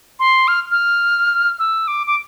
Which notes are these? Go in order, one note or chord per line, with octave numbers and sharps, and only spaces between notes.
C6
F6
F6
E6
D6
D6